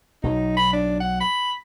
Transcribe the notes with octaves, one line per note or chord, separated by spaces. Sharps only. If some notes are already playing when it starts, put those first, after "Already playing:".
B1 B2 F#3 D#4
B5
D4
F#5
B5